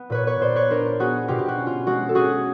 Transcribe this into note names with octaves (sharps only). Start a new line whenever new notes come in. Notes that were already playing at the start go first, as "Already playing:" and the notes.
Already playing: B3
A#2 B4 C#5
B4 C#5
A#2 C5 D5
B4 C#5
D4 A#4 C5
B3 F#4 G#4
B2 F4 G4
G4
F#4
C#4
F4
G#3 F#4
A4
C#4 F#4 G#4